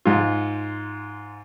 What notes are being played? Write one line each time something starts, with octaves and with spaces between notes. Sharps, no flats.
G#2 F4